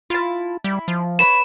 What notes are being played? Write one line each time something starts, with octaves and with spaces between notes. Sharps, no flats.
E4 F4 A5
G3 E4
F3
B4 C#5 B5 E7